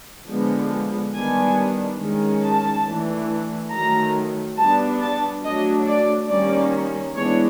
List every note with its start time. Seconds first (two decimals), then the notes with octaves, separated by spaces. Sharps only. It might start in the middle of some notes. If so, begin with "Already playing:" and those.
0.28 D3 F3 G#3 B3
1.14 D#3 G3 B3 D4 G#5
2.00 D#3 G#3 C#4
2.43 A5
2.85 E3 A3 D4
3.72 D#3 F#3 A3 A#5
4.57 G3 B3 D4 A5
5.01 A5
5.43 F#3 A3 D4 D#5
5.87 D5
6.29 D#3 G3 A#3 C#4 D5
7.15 E3 G#3 B3 D4 C#5